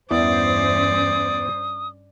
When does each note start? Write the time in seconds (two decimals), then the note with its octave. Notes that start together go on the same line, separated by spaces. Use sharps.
0.11 E2 G2 E3 C#4 E4 C5 D5 D#6